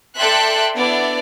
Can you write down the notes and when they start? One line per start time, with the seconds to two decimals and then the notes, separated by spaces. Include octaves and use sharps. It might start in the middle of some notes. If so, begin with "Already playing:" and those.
0.16 A4 D5 E5 G5 C6 F#6
0.75 B3 D4 E4 D5